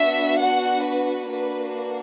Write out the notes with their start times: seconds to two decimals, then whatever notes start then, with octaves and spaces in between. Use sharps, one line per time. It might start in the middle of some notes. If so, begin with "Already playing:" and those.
Already playing: B3 D4 F#4 E5
0.40 F#5
0.86 B4
1.31 A#3 D4 F#4 B4